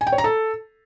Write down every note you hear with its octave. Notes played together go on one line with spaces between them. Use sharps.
G#5
G5
C#5
A#5
A4